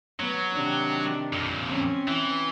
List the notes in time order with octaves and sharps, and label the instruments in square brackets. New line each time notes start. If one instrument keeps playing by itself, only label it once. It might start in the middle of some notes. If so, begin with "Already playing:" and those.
[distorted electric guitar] F#3 [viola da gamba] B3
[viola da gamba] C3 D#3 D4
[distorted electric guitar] F2 A#2
[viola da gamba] C4 C#4
[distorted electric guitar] E3